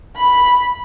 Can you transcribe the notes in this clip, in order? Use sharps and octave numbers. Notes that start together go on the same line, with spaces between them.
B5